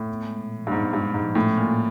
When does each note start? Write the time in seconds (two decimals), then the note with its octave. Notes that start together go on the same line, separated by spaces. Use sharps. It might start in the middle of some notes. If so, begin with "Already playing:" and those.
Already playing: A2
0.09 B3
0.25 G#3
0.41 A#2
0.56 F3
0.67 G2
0.72 G#2 B3
0.89 G2 G#3
1.05 A#2
1.14 G#2
1.20 F3
1.35 A2 C#4
1.52 A3
1.57 A#2
1.68 A2